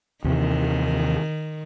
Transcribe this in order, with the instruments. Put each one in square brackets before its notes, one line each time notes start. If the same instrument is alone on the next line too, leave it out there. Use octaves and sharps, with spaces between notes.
[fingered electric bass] D#2 C3 E3 [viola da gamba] D#3